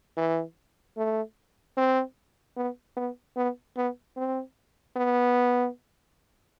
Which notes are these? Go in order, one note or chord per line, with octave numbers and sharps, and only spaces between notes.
E3
A3
C4
B3
B3
B3
B3
C4
B3